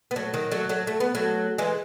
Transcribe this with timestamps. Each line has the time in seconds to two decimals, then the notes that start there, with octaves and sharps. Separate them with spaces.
0.11 B3
0.16 F#3 A3
0.34 D#3 F#3
0.52 F#3 A3
0.69 F#3 A3
0.87 A3
1.00 B3
1.15 F#3 A3
1.58 E3 G#3